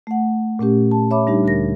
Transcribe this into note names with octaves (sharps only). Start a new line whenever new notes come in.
A3 F#5
A#2 A3 C#4 G4
A5
C#5 E5 B5 D6
G3 D4 D#4 G4
D2 D3 G4 A#4 A#6